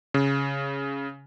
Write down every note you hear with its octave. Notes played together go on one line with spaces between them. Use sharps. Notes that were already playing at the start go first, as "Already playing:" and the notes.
C#3